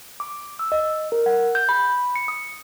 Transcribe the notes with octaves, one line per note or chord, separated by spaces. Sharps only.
D6
E6
D#5
A#4
F#5
G6
B5
C#7
D#6